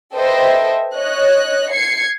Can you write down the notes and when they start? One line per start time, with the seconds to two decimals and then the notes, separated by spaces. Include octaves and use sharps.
0.15 A4 B4 C5 D#5 E5 G5
0.96 C#5 D#5 F#6
1.72 G#6 C7 C#7